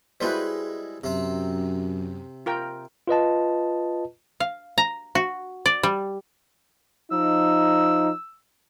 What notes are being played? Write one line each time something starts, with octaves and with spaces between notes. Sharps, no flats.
G3 G#3 E4 F#4 B4 C5
F#2 C3 C4
F4 A#4 G5
F4 B4 D#5 A5
F5
A#5
F#4
D5
G3
F3 D#4 E6